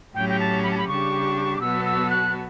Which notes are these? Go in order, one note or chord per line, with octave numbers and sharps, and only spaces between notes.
A2 F#3 C#4 G4 G5
G5
A5
B5
A5
B5
C#3 G3 D4 G4 C#6
D6
B2 F#3 B3 F#4 A4 E6
E6
F#6